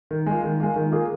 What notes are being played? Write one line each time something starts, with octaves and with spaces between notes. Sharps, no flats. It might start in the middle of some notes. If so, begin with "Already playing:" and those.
D#3
G#3 F4
D#3
G#3 F4
D#3
A#3 F4 G#4